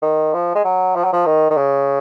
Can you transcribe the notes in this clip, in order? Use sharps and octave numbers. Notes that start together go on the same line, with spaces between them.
D#3
F3
G#3
F#3
F3
F#3
F3
D#3
D#3
C#3